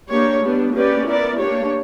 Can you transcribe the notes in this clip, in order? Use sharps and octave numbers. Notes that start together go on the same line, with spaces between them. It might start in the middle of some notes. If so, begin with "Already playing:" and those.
A#3 D4 G4 C#5
G3 B3 D4
A#3 C#4 G4 B4 D5
B3 E4 A#4 D5
A#3 D4 G4 C#5